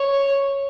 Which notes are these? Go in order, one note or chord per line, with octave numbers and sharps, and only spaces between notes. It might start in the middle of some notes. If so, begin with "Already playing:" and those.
Already playing: C#5